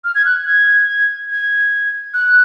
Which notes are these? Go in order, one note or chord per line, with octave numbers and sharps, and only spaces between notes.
F6
G#6
F#6
G#6
G#6
F#6